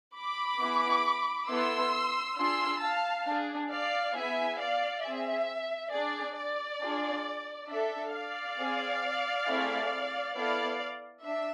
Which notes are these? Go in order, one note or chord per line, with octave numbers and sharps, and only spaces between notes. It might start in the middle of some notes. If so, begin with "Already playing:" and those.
B5 D6
B3 E4 G#4
B3 E4 A4 C6 E6
D4 F4 G#4 C6 E6
F5 A5
D4 G#4
D5 F5
B3 E4 G#4 E5 G#5
D5 F5
C4 G#4 E5
D4 G#4 D5
D5
D4 F4 G#4
D4 A4 E5
D5 F5
C4 G#4
A3 C4 E4 G#4
B3 E4 A4 D5 F5
D4 E5